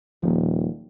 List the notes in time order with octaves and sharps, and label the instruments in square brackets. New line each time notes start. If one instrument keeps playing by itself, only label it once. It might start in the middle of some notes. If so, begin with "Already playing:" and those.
[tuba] D#1 [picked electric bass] F3 A#3